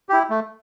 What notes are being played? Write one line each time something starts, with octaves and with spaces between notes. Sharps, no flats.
E4 G4
A3